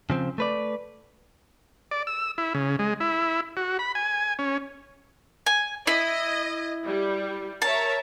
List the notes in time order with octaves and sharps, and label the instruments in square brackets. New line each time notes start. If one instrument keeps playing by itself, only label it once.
[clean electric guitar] C#3 F3 C4
A3 B4 D5
[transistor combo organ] D5
E6
E4
C#3
G#3
E4
F#4
B5
G#5
C#4
[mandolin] G#5
[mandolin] E4 [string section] D#5
[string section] G3
[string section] A#4 C#5 E5 [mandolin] A5